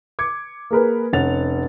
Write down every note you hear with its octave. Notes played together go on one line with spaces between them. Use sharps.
D6 G#6 C#7
A#3 G#4 A#4 B4
F1 C#4 F#5 A6 F7